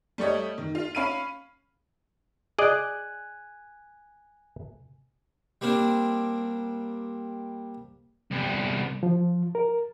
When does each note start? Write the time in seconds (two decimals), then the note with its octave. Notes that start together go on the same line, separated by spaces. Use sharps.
0.18 G3 A3 C#5 D#5
0.58 D#3
0.75 F4
0.95 C#4 F5 B5 D#7
2.59 G#4 D5 D#5 G#5 F#6
5.61 G3 A#3 C4 D4
8.31 C2 B3
9.03 F3
9.55 A#4